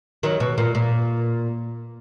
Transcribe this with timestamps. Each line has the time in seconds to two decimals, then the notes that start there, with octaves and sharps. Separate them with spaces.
0.23 D#3 F#3
0.40 B2
0.58 A#2
0.75 A#2